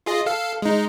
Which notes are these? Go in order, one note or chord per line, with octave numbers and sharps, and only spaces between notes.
F4 G#4 D#5
A4 F5
G#3 D#4